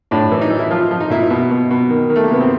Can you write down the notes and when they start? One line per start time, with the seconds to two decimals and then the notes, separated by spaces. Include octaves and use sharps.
0.11 A2 D4
0.32 E3
0.41 D#4
0.50 E3
0.59 E4
0.71 F3 F4
0.91 F3
1.00 D#4
1.10 A#2 E4
1.20 D#4
1.30 B2
1.51 B2
1.71 B2
1.90 D#3
2.10 D#3
2.16 A3
2.24 A#3
2.30 C3 B3
2.40 C4